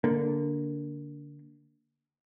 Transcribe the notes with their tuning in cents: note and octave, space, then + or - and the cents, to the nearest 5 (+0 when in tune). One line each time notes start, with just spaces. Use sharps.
D3 -15 A#3 +0